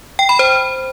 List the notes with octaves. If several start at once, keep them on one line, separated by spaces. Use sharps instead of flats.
G5
B5
C5